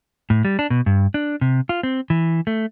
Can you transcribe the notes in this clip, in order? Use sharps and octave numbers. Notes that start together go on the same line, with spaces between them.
A2
G3
D4
B2
G2
D4
C3
F4
C4
E3
A3